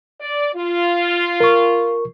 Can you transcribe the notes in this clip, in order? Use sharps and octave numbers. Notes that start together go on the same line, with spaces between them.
D5
F4
A#4 C#6